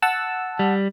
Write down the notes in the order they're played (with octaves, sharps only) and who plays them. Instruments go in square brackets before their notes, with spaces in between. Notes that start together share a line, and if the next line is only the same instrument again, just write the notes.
[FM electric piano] F#5 A5 E6
[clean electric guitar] G3